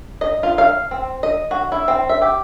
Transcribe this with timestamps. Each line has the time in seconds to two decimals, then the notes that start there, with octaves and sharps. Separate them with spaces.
0.21 D#5
0.43 F4
0.58 F5
0.91 C4
1.23 D#5
1.51 F#4
1.72 E4
1.88 C4
2.09 E5
2.22 G4